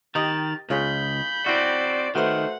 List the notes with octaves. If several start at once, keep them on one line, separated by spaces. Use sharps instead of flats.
D#3 G4 D#5 A6
C#2 F4 G#4 C#5 B5 G6
C4 E4 F#4 D5
D#3 A3 F#4 B4 C5 F#5 F6